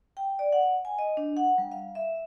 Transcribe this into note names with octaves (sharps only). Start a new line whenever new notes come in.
G5
D5
F#5
G#5
D#5
D4
F#5
G3
F5
E5